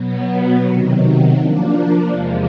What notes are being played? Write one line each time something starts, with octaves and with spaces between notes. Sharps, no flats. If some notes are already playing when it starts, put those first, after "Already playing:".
Already playing: B2 F#3 B3
C3 D#3 F#3
F3 A#3 D4
E2 C3 F3 G#3